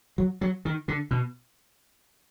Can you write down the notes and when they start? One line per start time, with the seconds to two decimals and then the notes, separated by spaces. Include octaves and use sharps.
0.18 F#3
0.41 F#3
0.65 D#3
0.88 D3
1.11 B2